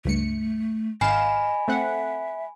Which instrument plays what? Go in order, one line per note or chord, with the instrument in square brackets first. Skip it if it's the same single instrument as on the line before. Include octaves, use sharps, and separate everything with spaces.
[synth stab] C#2 G2 C#7 [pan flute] A3
[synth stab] G#1 F5 E7 [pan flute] D#5 [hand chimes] G#5 B5
[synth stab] A3 C4 F#5 [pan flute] E5